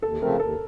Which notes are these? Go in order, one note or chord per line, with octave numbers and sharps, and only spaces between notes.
D#2 A4
C#3 F3 A3 C4 A#4
D#2 A4